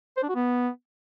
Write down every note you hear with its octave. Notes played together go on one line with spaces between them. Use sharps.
C5
D4
F#4
B3